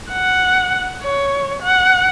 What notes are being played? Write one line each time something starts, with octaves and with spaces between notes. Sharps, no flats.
F#5
C#5
F#5